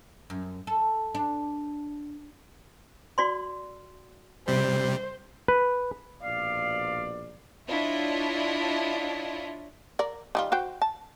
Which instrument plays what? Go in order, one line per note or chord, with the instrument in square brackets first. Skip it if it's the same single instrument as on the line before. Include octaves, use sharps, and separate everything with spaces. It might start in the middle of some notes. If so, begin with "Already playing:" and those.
[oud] F#2
A4
D4
[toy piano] F#4 D5 C6
[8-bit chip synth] C3 G3 [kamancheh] C5
[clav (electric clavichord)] B4
[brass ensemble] A#1 B2 D5 [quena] F5
[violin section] D4 E4 F4 C#5 D#5 E5
[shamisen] A#4 D5
D#3 G3 F4
F#4 C5 G5
A5